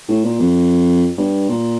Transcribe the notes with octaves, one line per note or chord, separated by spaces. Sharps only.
A2
A#2
F2
G2
A#2